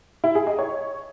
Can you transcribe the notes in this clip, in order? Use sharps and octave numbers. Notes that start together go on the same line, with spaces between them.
E4
G#4
D#5
C#5